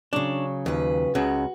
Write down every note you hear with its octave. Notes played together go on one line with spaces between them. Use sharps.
C#3 F#3 D4
D#2 F3 B4
C#2 C#3 F#4